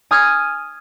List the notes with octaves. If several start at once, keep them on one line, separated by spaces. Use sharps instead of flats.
G#5 D#6 F6 G#6